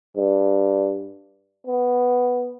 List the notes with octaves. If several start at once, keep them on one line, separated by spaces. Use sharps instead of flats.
G2
B3